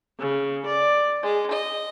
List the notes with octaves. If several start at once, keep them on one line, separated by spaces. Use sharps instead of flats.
C#3
D5
G#3
D#5